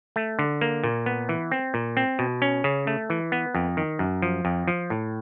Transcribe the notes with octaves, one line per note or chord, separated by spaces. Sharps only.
A3
D3
A#3
A#2
B3
E3
C4
A#2
C4
B2
C#4
C#3
A3
E3
B3
F2
D#3
F#2
F3
F2
F3
A2